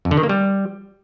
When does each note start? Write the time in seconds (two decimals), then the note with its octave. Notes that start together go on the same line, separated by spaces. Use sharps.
0.05 F2
0.11 D3
0.17 D#3
0.23 A#3
0.29 G3